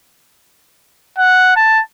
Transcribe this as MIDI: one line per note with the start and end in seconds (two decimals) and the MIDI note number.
1.18 1.55 78
1.56 1.81 81